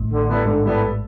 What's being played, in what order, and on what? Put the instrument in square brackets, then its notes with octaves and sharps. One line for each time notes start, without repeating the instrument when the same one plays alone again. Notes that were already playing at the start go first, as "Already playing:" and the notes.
Already playing: [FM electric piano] A1 A2
[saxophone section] D3
G3 B3 E4 A4
[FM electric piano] G#2 [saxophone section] D3
[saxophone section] G3 B3 E4 A4